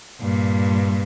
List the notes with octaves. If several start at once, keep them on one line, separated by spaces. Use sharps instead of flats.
G2 A#2